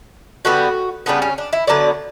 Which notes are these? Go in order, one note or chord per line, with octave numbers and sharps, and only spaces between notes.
D3 G3 B3 F#4
C#3 G3 B3 D4
C#4
D4
E4
D3 F#3 B3 D5